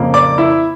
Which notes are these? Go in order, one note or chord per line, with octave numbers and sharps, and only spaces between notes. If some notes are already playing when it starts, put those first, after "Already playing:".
Already playing: F2 C#3 F3 A#3
D5 D6
E4 E5